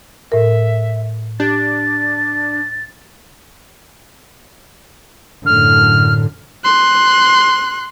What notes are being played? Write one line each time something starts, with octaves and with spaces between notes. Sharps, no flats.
A2 A#4 E5
D4 G4 A6
F#2 A2 D3 F6
C6 F#6